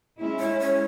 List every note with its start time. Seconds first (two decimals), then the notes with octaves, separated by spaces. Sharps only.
0.19 G#3 C#4 E4
0.40 C#5
0.60 C#5